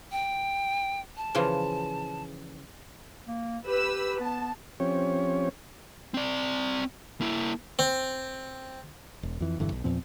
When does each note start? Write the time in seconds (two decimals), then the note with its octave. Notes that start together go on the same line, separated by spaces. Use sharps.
0.11 G5
1.17 A5
1.35 C#3 E3 F3
3.27 A#3
3.65 G4 B4 E6
4.20 B3 A5
4.80 F3 C4 C#4 G4 C#5
6.14 C4 D5
7.21 A#3 E4
7.79 C4
9.23 E1
9.40 F2 E3
9.59 E1 G2 D3 E3
9.72 B1
9.84 E2 A#2 F3 C4